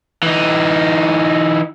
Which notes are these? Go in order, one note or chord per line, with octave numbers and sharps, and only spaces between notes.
E3 D#4